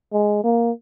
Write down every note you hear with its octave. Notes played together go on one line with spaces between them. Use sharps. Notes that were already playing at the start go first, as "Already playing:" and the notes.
G#3
A#3